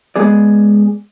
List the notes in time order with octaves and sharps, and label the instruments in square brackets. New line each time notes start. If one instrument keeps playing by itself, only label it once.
[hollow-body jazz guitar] G#3 B3 G#4 D5